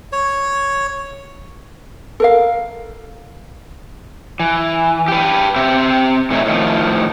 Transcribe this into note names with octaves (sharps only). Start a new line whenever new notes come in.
C#5
A4 A#4 F5
E3
G4 B4
C4 G4 E5
A2 C3 E3 C4 D#4 E4
A2 D#3 F3